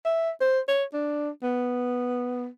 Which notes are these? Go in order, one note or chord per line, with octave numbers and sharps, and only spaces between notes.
E5
C5
C#5
D4
B3